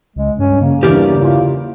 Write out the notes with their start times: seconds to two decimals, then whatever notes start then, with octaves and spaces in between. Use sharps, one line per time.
0.16 C#2 G#3
0.39 G2 C#4
0.61 C#3 A#3
0.83 E2 G2 G4 A#4 D5
1.21 E4 F4